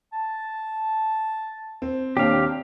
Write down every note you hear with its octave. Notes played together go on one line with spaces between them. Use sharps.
A5
C4
D#2 D4 G4 F5 G5